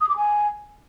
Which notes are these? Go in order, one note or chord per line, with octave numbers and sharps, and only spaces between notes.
D#6
D6
G#5